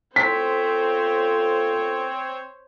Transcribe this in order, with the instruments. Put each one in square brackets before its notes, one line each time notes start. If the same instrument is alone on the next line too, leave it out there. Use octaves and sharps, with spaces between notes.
[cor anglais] C4 [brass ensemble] C#4 F4 A4 [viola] C5 C#5 [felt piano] B6